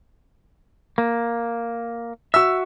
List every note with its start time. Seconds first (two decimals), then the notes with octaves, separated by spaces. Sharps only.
0.98 A#3
2.34 F#4 E5 E6